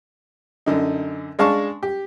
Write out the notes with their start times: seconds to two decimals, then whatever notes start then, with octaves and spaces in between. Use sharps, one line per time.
0.66 F#2 D3 D#4
1.39 G#3 D4 F5 A5 C#6
1.83 G4